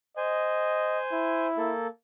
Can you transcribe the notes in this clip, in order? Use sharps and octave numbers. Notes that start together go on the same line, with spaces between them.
C5 D#5 G#5
E4
A#3 A4